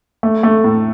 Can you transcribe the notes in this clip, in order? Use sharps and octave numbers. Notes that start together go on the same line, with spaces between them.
A3
A3
A2